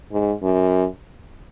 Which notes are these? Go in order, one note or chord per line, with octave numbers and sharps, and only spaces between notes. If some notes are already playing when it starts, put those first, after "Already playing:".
G#2
F#2